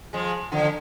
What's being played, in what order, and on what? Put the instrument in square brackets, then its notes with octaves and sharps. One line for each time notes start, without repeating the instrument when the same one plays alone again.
[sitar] F3 G#3
D3 F3